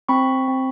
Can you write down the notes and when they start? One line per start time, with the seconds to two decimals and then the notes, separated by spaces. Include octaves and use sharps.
0.09 C4 B5 C#6
0.48 C4